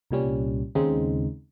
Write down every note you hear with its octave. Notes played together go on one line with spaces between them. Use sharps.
C2 A#2 G3 C#4
D#2 C#3 G#3 C4 D#4